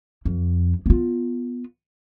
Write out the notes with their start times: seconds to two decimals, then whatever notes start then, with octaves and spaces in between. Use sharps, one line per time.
0.25 F2
0.86 B3 F4